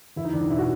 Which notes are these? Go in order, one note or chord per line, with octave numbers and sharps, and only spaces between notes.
E2 E4
D#4
E2 D4
D#4
B2 E4
F#4